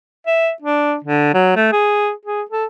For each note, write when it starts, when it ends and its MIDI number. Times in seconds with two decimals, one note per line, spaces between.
0.27 0.51 76
0.62 0.96 62
1.04 1.32 50
1.34 1.54 54
1.56 1.69 57
1.72 2.12 68
2.25 2.42 68
2.51 2.66 69